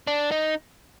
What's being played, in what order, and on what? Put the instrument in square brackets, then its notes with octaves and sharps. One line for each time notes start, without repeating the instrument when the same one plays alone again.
[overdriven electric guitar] D4
D#4